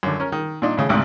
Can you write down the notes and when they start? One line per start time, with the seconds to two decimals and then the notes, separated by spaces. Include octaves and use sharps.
0.03 F#2 D3
0.20 C#4 A#4
0.32 D#3
0.62 A#2 D4 D#4
0.77 A2 C#3
0.89 G#1 D2 G#2 C3